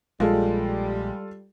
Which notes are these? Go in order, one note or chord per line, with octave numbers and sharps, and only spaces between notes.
A#1 G3 G#3 F4 A4